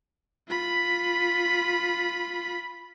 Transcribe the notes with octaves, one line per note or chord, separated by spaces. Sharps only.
F4 B5